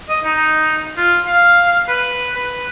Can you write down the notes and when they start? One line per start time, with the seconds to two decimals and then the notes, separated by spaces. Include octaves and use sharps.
0.09 D#5
0.24 D#4
0.97 F4
1.27 F5
1.88 B4
2.36 B4